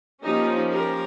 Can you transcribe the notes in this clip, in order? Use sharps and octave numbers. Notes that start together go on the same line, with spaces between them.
F3 A#3 C#4 D#4 G4
G4 A#4